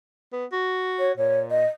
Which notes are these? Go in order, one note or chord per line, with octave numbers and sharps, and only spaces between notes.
B3
F#4
C#5
A#2 C#5
D#5